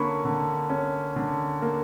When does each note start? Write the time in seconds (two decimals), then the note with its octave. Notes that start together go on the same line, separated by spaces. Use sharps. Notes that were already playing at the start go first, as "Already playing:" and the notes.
Already playing: D3 A#3 C#4 B5 C#6
0.25 D3
0.70 C#4
1.16 D3
1.62 A#3